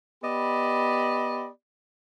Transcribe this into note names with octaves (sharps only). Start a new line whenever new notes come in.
B3 G4 D5 D#5 B5